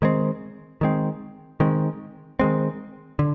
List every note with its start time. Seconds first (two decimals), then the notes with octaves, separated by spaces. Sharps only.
0.02 D#3 G#3 C4
0.81 D#3 G#3 C4
1.60 D#3 G#3 C4
2.39 D#3 G#3 C4
3.19 D3